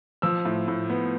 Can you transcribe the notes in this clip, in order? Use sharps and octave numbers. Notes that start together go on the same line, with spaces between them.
F3 E6
A2
A2
B3